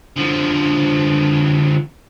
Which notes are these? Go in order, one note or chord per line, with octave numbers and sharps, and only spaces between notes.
D3 F3